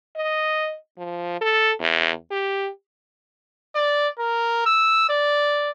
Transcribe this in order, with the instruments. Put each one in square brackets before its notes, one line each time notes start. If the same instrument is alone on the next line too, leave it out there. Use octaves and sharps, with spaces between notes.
[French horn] D#5
F3
A4
E2
G4
[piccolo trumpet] D5
A#4
E6
D5